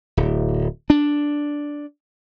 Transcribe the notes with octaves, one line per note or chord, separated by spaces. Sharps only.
D1
D4